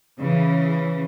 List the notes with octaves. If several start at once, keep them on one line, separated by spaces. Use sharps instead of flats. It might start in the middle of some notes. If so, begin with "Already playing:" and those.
C#3 E3